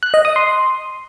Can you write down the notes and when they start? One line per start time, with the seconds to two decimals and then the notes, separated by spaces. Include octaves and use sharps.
0.03 F#6
0.14 D#5
0.25 D#6
0.36 C6